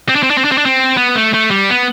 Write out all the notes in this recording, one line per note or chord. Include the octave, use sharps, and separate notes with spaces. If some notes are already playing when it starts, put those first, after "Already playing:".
C4
D4
C4
D4
C4
D4
C4
D4
C4
B3
A3
A3
G3
B3